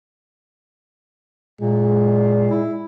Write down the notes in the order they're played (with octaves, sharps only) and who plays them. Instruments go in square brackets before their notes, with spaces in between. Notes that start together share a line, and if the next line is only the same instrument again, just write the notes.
[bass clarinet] A#2 [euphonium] G#3
[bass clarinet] E4